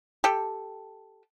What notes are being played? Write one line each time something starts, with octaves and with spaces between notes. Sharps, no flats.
G4 A4